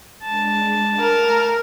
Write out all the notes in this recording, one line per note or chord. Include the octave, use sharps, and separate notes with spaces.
G#3 D4 A5
A3 A#4 F5